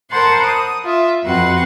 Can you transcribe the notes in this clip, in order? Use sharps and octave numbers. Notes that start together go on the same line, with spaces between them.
A#4 C5 F#5 A5 B5 C6
D#6
F4 E5
F2 C4 F#4 B4 F#5 C6